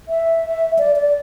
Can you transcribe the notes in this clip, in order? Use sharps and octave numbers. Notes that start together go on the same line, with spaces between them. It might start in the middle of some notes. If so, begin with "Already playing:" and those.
E5
D5
D5